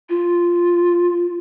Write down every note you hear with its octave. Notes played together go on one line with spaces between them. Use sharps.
F4